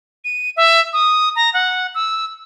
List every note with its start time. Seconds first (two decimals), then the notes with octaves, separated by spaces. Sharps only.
0.25 D#7
0.57 E5
0.93 D#6
1.36 A#5
1.54 F#5
1.95 E6